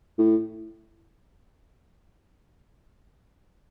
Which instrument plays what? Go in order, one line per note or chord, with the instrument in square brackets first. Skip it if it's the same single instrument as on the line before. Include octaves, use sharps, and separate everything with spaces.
[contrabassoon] A2